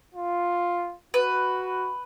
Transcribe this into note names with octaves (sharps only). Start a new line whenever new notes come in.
F4
F#4 B4